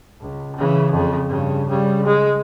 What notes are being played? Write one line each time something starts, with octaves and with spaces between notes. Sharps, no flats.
C#2
C#3 E3
F2 C#3
G2 C#3
C#3 G3
G#3